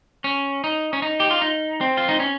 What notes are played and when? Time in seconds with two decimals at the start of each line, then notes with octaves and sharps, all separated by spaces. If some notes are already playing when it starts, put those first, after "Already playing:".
0.24 C#4
0.64 D#4
0.93 C#4
1.02 D#4
1.20 G4
1.31 F4
1.41 D#4
1.81 C4
1.97 F4
2.09 D#4
2.20 C#4